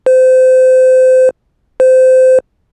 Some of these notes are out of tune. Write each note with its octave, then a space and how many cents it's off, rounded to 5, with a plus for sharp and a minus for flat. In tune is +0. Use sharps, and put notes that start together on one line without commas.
C5 -25
C5 -20